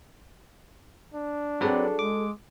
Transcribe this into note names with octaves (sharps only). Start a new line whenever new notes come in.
D4
F#3 C4 F#4 G#4 A4 B4 D5
G#3 D6